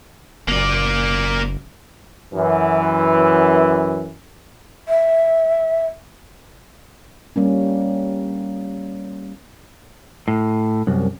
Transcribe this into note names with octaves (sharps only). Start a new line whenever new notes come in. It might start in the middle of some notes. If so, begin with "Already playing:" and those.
F#1 A#3 D5
F#2 E3
E5
G3 A#3 C#4
A2
C2 F#2